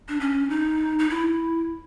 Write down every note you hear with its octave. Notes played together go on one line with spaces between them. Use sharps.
D4
C#4
D#4
D#4
E4